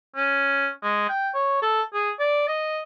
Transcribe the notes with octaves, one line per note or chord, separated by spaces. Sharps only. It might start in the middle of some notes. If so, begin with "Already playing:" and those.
C#4
G#3
G5
C#5
A4
G#4
D5
D#5